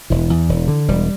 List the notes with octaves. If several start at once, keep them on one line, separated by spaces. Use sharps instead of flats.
E1 E3
E2
E1
D3
E1 G3